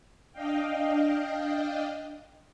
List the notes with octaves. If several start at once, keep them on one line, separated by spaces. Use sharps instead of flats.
D4 D#5 F5 G5